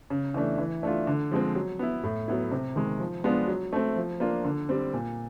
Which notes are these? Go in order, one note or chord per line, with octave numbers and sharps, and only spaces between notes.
C#3
E3 A3 D4
E3
A3 D4 F4
D3
F3 G#3 C4
F#3
B3 E4
A2
F#3 B3 E4
C3
D#3 G#3
F3
G#3 B3 D4 F4
F#3
A3 C4
F3
A#3 D4 F4
D3
G3 C4
A#2